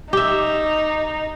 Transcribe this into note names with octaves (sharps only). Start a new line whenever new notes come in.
D#4 G4 E5